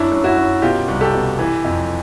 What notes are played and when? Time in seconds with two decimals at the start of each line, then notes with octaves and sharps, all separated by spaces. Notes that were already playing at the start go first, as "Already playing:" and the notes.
Already playing: F#2 D4 E4
0.12 F#2
0.24 E4 F#4
0.37 F#2
0.62 B2 F4 G4
0.88 C2
1.01 G4 A4
1.14 B2
1.39 E3
1.64 F2